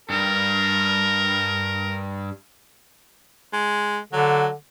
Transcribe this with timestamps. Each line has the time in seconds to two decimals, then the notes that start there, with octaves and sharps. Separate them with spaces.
0.10 G2 G3 A#4
3.53 G#3
4.13 D3 F#3